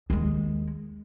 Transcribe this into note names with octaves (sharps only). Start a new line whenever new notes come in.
D#2 G#3